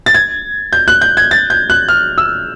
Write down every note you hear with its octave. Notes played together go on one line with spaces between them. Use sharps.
A6
G#6
G6
F#6
G6
G#6
A6
G6
F#6
F6
E6